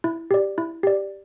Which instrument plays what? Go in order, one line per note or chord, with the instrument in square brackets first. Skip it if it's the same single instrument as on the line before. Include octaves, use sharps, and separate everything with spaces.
[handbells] E4
G4 D5
E4
G4 D5